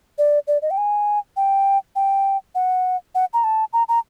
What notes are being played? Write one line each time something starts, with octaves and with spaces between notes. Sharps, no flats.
D5
D5
D#5
G5
G#5
G5
G5
F#5
F#5
A#5
A5
A#5
A#5